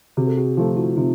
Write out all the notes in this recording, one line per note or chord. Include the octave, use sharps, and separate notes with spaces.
C3 F#4 G#4
A4
F#4 G#4
F3 A3 F4 G4
E4 F#4
C3 D#4 F4